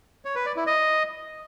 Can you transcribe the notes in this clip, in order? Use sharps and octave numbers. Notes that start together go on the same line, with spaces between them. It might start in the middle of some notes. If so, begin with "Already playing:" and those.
C#5
B4
D5
E4
D#5